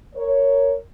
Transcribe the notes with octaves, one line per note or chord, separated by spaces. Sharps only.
A#4 C#5